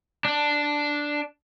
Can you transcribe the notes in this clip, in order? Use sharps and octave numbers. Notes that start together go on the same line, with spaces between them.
D4